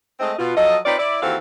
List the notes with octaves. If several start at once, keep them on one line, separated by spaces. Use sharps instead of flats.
G#3 A3 C4 D#5
B2 F4
F3 F#3 A4 D#5
C4 D#4 F4 B4 C#5 D5
E4 D5
D#2 E3 C4 F#4 A4 F5